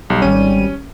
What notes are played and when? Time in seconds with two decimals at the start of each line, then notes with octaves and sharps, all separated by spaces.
0.10 B1 G3
0.22 G#1 G3 C#4 D#7